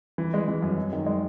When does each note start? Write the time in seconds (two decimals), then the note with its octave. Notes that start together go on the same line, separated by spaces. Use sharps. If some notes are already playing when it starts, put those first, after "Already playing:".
0.18 E3
0.34 G#3
0.48 E3
0.62 F#2
0.78 F#2
0.93 D#3
1.07 G#3